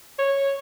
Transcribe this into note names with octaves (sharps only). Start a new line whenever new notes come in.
C#5